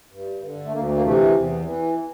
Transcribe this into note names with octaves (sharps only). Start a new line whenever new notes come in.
G2
D3
A3
D2 A#3
A#3
C3 E3 A3
E2
E3